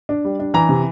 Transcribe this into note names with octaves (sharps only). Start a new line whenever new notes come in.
D4
G3
D4
E3 A#5
C3